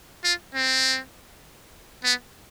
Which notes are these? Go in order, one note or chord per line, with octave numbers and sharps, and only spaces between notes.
F4
C4
B3